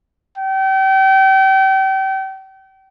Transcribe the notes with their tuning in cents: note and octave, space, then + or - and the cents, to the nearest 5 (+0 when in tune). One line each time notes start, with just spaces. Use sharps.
G5 -35